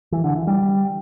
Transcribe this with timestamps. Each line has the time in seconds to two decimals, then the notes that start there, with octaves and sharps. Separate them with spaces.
0.12 E3
0.24 D3
0.36 E3
0.47 G3